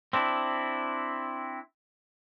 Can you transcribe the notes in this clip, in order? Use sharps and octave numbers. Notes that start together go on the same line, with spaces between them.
C4 D4 E4